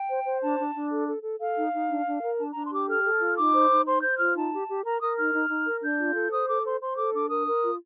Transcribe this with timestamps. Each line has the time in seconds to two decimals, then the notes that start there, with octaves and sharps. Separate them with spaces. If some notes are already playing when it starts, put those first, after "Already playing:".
Already playing: G5
0.10 C5
0.25 C5
0.41 D4 A5
0.59 D4
0.74 D4
0.92 A4
1.08 A4
1.23 A4
1.40 A4 F5
1.57 D#4
1.73 D#4
1.90 D4
2.06 D4
2.22 A#4
2.38 D4 A5
2.50 D4 A#5
2.64 C6
2.72 G4 D6
2.87 A4 F6
3.04 A4
3.21 F4
3.36 D#4 D6
3.53 C5
3.70 D#4
3.86 C5 C6
4.02 C5 G6
4.18 F4 F6
4.34 D#4 A5
4.52 G4
4.68 G4
4.84 A#4 A#5
5.01 A#4 D#6
5.17 D#4 F6
5.33 D#4
5.49 D#4
5.66 A#4
5.82 D4 G6
5.99 F4
6.15 A4
6.31 C5 D#6
6.48 A4 D6
6.64 C5 C6
6.81 C5 C6
6.96 A4 D6
7.13 D4 D6
7.29 A#4 D#6
7.47 A#4
7.63 F4